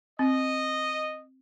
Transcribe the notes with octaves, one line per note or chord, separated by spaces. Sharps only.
C4 D#5